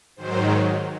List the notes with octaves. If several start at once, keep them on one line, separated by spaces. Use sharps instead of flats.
G#2 D#3 F#3 C5